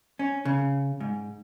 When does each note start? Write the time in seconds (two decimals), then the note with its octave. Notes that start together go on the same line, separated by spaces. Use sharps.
0.19 C#4
0.45 C#3
1.00 G#2